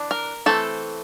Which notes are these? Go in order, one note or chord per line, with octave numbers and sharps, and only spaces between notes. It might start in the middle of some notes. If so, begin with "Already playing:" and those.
Already playing: E3 D4
A#4
E3 A3 C4 A4